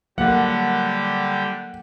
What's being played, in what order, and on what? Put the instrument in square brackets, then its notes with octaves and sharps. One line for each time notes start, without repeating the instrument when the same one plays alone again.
[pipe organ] D3 G3 G4 [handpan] F#3 A#3 A4 [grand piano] F#5